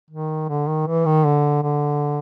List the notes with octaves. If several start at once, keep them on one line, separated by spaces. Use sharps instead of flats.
D#3
D3
D#3
E3
D#3
D3
D3